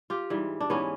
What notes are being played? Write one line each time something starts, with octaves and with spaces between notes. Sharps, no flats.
F4 G4
G#2 E3 G3
D4
G#2 E3 G3 B3 C#4